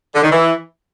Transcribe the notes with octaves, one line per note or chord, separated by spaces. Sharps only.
D3
D#3
E3